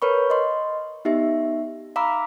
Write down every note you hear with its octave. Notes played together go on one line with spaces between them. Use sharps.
A#4 B4 C#5 B5 C#6
D#5 C6
B3 D#4 G4 E5
F5 A#5 B5 D6 E6